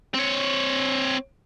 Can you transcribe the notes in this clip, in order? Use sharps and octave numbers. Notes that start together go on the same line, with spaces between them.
C4 C#5